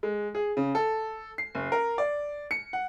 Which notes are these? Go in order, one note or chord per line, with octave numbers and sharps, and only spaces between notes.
G#3
G#4
C#3
A4
C7
F#1
A#4
D5
C#7
F#5